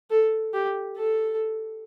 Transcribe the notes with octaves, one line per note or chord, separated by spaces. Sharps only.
A4
G4
A4